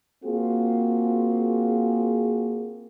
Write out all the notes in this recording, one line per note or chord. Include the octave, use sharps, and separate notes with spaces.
A#3 C4 F4 F#4 G#4